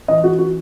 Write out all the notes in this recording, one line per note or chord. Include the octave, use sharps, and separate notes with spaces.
E3 D#5
F#4
F#4